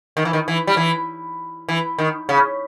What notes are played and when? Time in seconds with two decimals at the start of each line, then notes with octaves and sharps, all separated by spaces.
0.17 D#3
0.25 E3
0.33 D#3
0.48 E3
0.67 G3
0.77 E3
1.69 E3
1.99 D#3
2.29 C#3